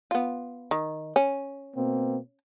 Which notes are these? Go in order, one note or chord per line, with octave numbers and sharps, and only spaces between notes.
B3 F4
D#3
C#4
B2 A#3 C4